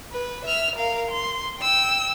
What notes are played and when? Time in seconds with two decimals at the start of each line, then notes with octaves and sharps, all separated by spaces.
0.12 B4
0.45 E5 F6
0.76 A#4 F5
1.11 C6
1.58 G5 E6